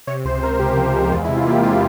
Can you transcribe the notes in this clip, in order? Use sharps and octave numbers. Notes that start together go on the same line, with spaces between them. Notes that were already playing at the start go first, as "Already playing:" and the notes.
C3 C#5
C#2 C5
C3 A#4
C#2 G4
F3
G#3
G4
E2 F4
E4
C3
F4
A#3 G4
C3 F4